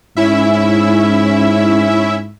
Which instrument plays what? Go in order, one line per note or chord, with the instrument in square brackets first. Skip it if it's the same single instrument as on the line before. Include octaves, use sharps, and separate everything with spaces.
[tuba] G#2 [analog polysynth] C#4 E4 E5